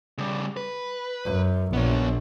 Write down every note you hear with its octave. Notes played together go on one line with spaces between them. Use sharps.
C#3 G3
B4
F#2
A#1 B3 C#5